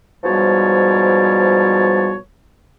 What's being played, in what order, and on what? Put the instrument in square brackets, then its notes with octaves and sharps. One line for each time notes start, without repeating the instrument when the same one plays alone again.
[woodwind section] G#2 B2 F3 G3 C#5 A5